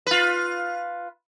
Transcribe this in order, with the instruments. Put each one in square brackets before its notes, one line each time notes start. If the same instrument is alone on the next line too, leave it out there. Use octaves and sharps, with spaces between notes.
[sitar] F4 B4